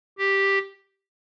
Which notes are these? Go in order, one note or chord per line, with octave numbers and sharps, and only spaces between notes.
G4